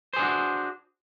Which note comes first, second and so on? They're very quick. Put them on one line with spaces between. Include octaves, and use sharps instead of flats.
C5 G#4 D4 F#4